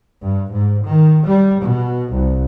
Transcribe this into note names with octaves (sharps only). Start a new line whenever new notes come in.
G2
G#2
D#3
G3
B2
C2